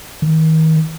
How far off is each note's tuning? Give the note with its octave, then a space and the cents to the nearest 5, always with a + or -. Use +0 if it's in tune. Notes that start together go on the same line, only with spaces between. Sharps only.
D#3 +35